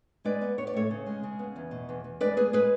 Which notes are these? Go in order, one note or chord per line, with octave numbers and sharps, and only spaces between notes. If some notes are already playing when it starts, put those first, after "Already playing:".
G#3 B4 D5
B3
B3 C#5
D5
A2 A4 C#5
C#3
G#3
C#3
B3
E2
B2
E2
E2
G#3 B4 D5
B3 G#4 B4
G#3 G#4 B4